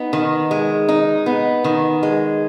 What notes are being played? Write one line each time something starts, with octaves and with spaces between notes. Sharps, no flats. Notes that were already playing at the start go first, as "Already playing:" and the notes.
Already playing: B3 D#4
D#3
G#3
D#4
B3
D#3
G#3